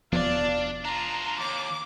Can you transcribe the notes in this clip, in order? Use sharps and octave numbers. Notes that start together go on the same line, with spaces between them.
E1 F3 B3 D4 D5 F5
D4 F4 A#5
D#2 D6